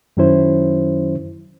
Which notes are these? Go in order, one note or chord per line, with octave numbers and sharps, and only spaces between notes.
F#2 D#3 F#3 C#4 E4 C5